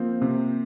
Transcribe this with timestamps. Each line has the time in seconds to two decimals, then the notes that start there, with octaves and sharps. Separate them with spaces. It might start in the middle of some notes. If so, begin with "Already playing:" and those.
Already playing: F3 A#3 C4
0.21 C3